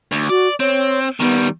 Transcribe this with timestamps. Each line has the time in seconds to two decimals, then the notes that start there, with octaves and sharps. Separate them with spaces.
0.12 D2
0.30 F#4 D5
0.60 C4 C#5
1.20 D#3 G3 B3